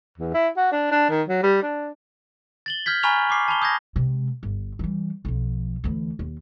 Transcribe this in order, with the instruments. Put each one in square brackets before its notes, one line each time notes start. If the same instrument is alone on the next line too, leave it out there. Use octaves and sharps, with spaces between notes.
[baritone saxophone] E2
E4
F#4
D4
D4
D#3
F#3
G3
D4
[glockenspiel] A6 F#7 G7
F6 G6 G#6 B6
G#5 A#5 B5 C#6 F6 F7
C#6 D6 C7
A5 B5 F7 G7
D#6 G6 G#6 A#6
[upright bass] C3 G#3
G1
E3 G3
B1 F3
D2 E3
D#2